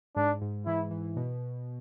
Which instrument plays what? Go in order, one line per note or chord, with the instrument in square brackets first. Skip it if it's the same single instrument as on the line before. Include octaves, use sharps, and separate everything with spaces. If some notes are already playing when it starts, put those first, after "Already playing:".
[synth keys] G#2 [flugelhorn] D4
[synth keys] G#2
[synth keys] E3 [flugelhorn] E4
[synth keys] E3
B2